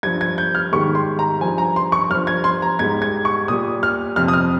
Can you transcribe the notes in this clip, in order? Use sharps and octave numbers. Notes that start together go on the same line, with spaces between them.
G2 F3 G#6
G#6
G6
F6
G#2 D#3 G3 C#6
C6
A#5
G2 F3 G#5
A#5
C6
C#6
G2 F3 F6
G#6
C6
A#5
G#2 G3 G#6
G#6
C#6
A#2 G3 D#6
F6
F2 C3 F3 F6
D#6
F6